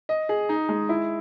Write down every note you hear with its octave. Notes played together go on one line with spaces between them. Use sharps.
D#5
G#4
D#4
G#3
E4